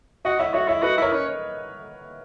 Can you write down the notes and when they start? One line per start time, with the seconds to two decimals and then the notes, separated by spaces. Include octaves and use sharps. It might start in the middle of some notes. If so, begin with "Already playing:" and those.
0.25 F#4 D#5 F#5
0.40 E4 C#5 E5
0.54 F#4 C#5 E5
0.68 E4 C#5 E5
0.83 F#4 B4 D#5
0.98 E4 A#4 C#5
1.12 C#4